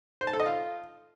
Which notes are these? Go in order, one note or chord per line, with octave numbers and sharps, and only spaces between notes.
C5
A5
A4
D#5
F4